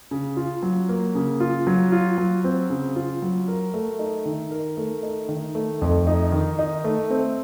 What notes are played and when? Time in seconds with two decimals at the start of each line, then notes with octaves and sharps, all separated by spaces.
0.11 C#3
0.36 F4
0.63 F#3
0.89 A#3
1.15 C#3
1.40 F4
1.67 F#3
1.92 F4
2.18 F#3
2.44 C4
2.70 C#3
2.96 F4
3.22 F#3
3.48 A#4
3.74 A3
3.99 D#4
4.25 D#3
4.51 A#4
4.77 A3
5.03 D#4
5.29 D#3
5.55 A3
5.82 F2
6.07 D#4
6.32 D#3
6.59 D#4
6.84 A3
7.10 C4